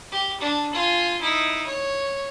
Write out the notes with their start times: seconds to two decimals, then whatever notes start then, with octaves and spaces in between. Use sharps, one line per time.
0.12 G4
0.40 D4
0.73 F4 G#5
1.21 D#4 E4
1.66 C#5